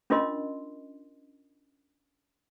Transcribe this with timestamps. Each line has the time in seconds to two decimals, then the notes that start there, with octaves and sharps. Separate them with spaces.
0.10 C#4 D4 F4 A#4 D#5 C6